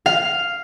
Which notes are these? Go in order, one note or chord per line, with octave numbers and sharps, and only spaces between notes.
F5